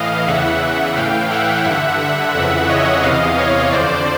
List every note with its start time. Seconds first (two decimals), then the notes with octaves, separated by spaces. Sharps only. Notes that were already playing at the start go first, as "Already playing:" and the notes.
Already playing: A2 E3 D#5 F5
0.28 E2 C#3 E3 E5 F#5
0.96 A2 E3 F5 G5
1.31 E5 F#5
1.65 G2 D3 E5 F#5
2.00 E5 F#5
2.35 F2 C#3 E3 E5 F#5
2.69 C#5 D#5
3.03 E2 C3 E3 D#5 F5
3.38 C#5 D#5
3.72 F2 D3 C5 D5